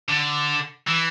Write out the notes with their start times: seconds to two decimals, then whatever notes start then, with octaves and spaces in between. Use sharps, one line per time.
0.09 D3
0.87 E3